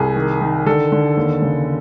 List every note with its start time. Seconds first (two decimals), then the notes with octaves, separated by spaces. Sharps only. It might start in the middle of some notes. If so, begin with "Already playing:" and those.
Already playing: C2 G#4
0.16 D#3
0.41 D#3
0.66 D3 A4
0.92 D3
1.17 D#2
1.42 C#3